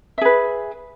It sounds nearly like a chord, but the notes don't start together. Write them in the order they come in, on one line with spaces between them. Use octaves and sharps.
E5 G#4 B4